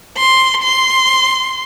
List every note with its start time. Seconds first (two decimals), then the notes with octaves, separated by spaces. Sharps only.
0.17 C6
0.63 C6